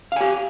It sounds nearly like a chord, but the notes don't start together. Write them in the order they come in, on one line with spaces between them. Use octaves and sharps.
F5 G#5 G4